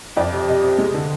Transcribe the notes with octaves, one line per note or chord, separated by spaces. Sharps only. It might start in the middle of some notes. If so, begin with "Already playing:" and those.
F2 D5
C3
C3 D#5
C3
G#3
D3